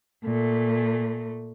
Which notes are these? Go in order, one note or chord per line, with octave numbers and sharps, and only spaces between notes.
A#2 A3